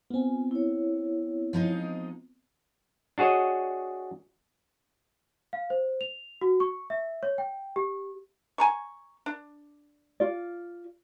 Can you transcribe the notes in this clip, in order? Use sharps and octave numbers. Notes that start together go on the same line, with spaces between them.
B3 C4 F4 G#5
E4 C#5
F3 G#3 D#4
D4 F#4 G#4 C#5 D#5
F5
C5
F7
F#4
C#6
E5
C#5
G5
G4
G#5 A#5 C#6
D4
F4 D5